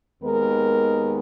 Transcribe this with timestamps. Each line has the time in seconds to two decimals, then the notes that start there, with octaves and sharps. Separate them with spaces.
0.21 D#2 D#3 G#3 B3 A#4